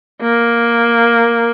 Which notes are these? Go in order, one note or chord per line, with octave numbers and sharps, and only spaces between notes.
A#3